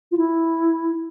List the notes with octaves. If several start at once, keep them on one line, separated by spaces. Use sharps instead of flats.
F4
E4